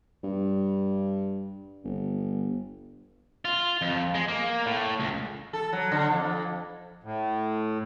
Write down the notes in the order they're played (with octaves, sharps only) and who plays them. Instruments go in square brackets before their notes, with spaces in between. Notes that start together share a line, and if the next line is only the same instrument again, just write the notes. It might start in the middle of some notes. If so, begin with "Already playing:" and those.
[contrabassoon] G2
G1
[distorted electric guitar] F4
F2
G#3
A#3
A2
C#2
[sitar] A4
F#3
D3
F2
[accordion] A2